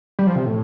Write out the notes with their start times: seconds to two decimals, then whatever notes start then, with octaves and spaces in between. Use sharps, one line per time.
0.19 G3
0.27 F3
0.35 C3
0.46 A2